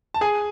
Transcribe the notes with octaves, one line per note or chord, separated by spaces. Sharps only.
A5
G#4 G#5